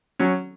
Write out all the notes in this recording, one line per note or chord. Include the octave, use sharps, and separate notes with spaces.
F#3 C#4